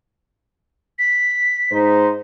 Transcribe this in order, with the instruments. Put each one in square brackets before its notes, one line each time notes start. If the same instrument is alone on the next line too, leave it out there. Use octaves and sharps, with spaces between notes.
[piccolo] B6
[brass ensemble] G#2 D#4 C5